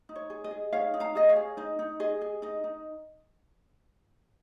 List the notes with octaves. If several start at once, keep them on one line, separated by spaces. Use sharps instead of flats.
D#4
C#5
G#4
D#5
G#4
D#4 C#5 F5
D#4
F5 A#5
G#4 D#5
C#5 F5
G#4
D#4 D#5
D#4
G#4 D#5
G#4
D#4 D#5
D#4